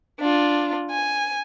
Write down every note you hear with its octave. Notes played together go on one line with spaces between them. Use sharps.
D4 F4
G#5